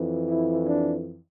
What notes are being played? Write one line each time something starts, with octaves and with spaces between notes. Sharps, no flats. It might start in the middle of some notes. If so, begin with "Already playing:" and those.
Already playing: F2 E3
E4
D4